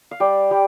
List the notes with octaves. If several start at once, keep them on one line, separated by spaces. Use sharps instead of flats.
F5
G3 D5 G5
G3